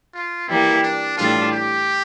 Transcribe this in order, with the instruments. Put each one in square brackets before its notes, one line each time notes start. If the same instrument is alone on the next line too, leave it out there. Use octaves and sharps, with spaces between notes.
[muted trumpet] F4
[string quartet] E3 G3 A#3 [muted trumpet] E4
[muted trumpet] D4
[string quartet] A2 E3 G3 D4 A4 [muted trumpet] F4
[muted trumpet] G4